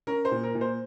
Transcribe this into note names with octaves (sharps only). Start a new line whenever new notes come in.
C#4 A#4
C5
A#2
A#4
A#2
C5